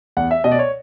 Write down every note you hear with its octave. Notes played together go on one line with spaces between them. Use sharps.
E2 F#5
E5
B2 D#5
D5
C#5